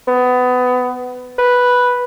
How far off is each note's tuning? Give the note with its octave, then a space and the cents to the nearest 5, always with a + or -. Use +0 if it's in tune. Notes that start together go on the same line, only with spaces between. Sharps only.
B3 +20
B4 -5